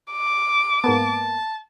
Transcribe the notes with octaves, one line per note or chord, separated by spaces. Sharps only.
D6
G#2 A#3 B3 A5